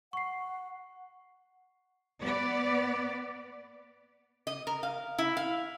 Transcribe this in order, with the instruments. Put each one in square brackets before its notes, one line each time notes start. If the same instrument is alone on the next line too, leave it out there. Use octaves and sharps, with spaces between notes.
[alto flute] F#5 [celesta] C#6 C7
[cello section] B3 D5
[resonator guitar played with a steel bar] D#5
A#4
F5
E4
F5